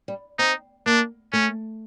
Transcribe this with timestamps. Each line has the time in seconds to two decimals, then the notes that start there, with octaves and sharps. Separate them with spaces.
0.08 G3
0.39 C4 D#4
0.86 A#3 D4
1.33 A3 C#4